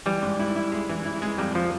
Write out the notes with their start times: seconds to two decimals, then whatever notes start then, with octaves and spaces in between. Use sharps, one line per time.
0.06 E3 G3
0.23 G#2
0.39 E4
0.56 E4
0.72 G#3
0.89 E3
1.05 E4
1.22 G#3
1.38 F2 G3
1.55 F3